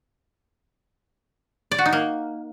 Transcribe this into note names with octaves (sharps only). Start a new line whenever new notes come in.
D5
F#4
D#4
A#3